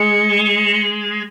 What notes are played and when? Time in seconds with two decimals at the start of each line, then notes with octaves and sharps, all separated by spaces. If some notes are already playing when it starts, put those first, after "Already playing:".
Already playing: G#3 C#7
0.44 C#7